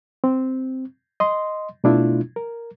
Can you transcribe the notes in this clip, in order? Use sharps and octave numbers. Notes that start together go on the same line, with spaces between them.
C4
D#5 C6
B2 A3 D4 E4 F4
A#4